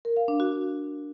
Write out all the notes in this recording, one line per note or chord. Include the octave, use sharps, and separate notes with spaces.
A#4
F5
D4
F#4